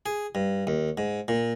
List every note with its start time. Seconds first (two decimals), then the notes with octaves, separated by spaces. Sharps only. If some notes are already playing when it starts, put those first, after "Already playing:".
0.06 G#4
0.35 G2
0.67 D#2
0.98 G#2
1.28 A#2